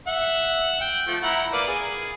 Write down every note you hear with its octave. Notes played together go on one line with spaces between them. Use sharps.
E5 F#5
G5
F3 A3
E4 F#5 A#5
A#3 B4 D5
G#4